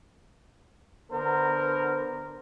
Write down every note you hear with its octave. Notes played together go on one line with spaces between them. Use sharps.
D3 B3 A#4 C5